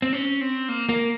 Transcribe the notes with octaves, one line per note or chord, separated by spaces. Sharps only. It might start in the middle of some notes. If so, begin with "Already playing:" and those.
C4
C#4
C4
A#3
A#3